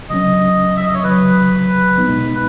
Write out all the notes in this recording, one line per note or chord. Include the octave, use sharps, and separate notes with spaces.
C#3 F#3 C#4 D#5
E5
D#5
C#5
D#2 C#3 F#3 B4
C#2 B2 G#3 B3 D#4